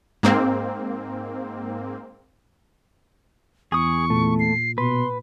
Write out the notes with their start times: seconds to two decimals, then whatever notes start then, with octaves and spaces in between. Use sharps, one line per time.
0.23 G#2 A#3 C4
3.72 E2 G#4 C#6 D#6
4.10 A#2 A3
4.39 C7
4.78 B2 B4 C6